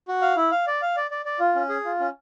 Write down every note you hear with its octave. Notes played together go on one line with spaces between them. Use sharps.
F#4
F5
E4
F5
D5
F5
D5
D5
D5
F4
C#4
G#4
F4
C#4